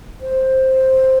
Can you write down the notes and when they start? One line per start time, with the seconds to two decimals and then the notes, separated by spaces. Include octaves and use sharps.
0.21 C5